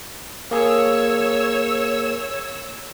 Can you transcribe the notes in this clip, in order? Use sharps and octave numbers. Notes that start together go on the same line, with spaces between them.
A#3 G#4 C#5 E6